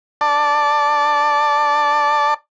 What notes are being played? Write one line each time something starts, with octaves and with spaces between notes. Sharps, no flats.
D5 A5